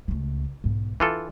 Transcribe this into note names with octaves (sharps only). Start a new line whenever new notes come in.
C#2 A3
B1 G#2
E3 D4 F4 A4